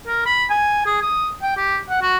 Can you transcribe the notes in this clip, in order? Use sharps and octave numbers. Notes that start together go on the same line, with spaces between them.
A#4
B5
G#5
G#4
D#6
G5
G4
F#5
F#4